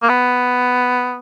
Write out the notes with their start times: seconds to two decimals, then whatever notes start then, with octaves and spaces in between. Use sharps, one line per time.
0.03 A#3
0.09 B3